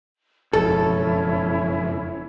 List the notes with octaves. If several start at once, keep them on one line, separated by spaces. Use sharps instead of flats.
F#1 F2 B2 C#4 E4 A4 C#5